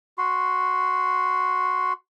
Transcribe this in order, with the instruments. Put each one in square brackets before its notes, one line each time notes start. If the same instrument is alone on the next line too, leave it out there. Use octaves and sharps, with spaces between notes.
[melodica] F#4 C6